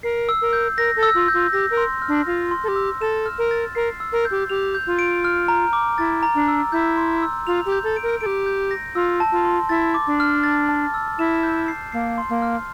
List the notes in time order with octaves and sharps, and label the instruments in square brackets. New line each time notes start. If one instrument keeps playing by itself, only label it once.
[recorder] A#4 [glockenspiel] C7
[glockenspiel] E6
[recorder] A#4
[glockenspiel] G6
[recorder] A#4 [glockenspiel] A#6
[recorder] A4
[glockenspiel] E6
[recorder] F4
[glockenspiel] G6
[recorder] F4
[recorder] G4 [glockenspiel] A#6
[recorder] A#4
[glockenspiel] C6
F6
[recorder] D4
[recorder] F4 [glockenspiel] A#6
[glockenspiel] C6
[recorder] A4
G4
[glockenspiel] E6
[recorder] A4 [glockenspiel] E7
[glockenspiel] F6
[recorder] A#4
[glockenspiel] A6
[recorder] A#4 [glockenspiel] C7
[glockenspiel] E6
[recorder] A#4
[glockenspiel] G6
[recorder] G4
[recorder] G4 [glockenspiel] F7
[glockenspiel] G6
[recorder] F4
[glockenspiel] D7
F6
A#5
D6
[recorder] E4 [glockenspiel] A6
[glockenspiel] A#5
[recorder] D4
[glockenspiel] E6
[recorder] E4 [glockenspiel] G6
[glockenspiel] C6
E6
[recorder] F4 [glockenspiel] F7
[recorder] G4
[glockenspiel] G6
[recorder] A4
[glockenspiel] D7
[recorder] A#4
[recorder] A4 [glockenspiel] D7
[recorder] G4
[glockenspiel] G6
A#6
[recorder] F4 [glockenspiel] E6
[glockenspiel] A5
[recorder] F4
[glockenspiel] C6
[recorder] E4 [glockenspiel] A6
[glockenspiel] D6
[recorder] D4
[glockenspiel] F6
A6
A5
E6
[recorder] E4 [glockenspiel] E7
[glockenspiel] G6
C7
[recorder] A#3 [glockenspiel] C7
[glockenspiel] C6
[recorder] A#3
[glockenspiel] F6